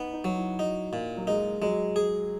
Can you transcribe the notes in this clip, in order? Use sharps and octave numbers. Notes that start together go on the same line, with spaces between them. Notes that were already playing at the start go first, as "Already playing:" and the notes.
Already playing: B3 D#4
D#4
F#3
E4
D#4 F#4
A#2
F#3
G#3 D#4
F#3 G#3
G#4